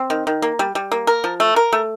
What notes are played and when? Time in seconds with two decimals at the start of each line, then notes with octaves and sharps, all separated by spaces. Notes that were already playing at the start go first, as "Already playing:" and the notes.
Already playing: C4
0.10 D#3
0.27 D#3
0.42 A#3
0.59 G3
0.75 G3
0.92 A#3
1.07 A#4
1.24 F3
1.40 A3
1.56 A#4
1.73 A3